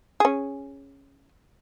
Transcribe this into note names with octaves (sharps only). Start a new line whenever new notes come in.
C#4 G#4